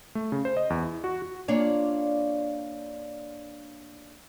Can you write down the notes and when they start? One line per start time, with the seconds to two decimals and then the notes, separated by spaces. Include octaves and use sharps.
0.15 A3
0.32 C#3
0.45 C5
0.57 D#5
0.70 E2
0.84 E4
1.04 F#4
1.22 F#4
1.48 A#3 D4 F4 C#5 D5